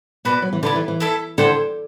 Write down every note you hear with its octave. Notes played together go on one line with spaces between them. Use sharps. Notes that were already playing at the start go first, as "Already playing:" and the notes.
B2 F#4 B4 D5
F#3
E3
D3 E4 B4 D5
E3
E3
E4 A4 E5
D3 E4 A4 C5 G5